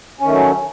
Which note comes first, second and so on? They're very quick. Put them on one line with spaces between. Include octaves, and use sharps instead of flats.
C#4 D#3 A3 F#3